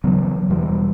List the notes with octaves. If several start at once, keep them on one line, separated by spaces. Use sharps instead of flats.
C#3 E3 F#3 B3
E2 B2 E3 G3